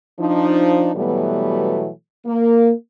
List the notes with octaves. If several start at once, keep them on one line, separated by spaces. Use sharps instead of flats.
F3 D4 D#4
B2 E3 F#3 G3 A3 B3
A#3